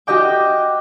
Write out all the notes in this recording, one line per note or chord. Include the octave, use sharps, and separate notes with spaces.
F#4 G4 D#5 G5 D6